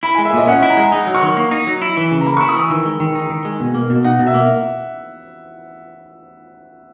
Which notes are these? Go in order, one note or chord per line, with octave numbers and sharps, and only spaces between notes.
E4 B5
G#3 G#5
E5
A#2 D#5
C#4 F#5
E4
A#5
G#3
D#4 F#5
F#3
C#6
D#3
A#3
D#4
F#3
E4
E3
C#3
A#5
A#3 B5
E4 C#6
D#6
E3 E6
D#3
G#3
D#3
D#4
D#3
G#3
B2
A#3
B2
D#4 F#5
B2
E5
A#3